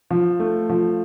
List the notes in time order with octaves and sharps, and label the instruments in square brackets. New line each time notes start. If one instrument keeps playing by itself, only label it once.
[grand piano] F3
A3
F3